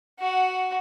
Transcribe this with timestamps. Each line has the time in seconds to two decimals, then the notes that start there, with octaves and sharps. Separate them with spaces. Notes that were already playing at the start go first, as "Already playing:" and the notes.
0.19 F#4 F#5